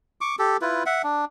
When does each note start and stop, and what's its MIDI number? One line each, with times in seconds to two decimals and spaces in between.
0.21 0.36 85
0.21 0.36 86
0.39 0.57 67
0.39 0.57 69
0.62 0.84 64
0.62 0.84 65
0.62 0.84 71
0.86 1.02 76
0.86 1.02 78
1.03 1.25 62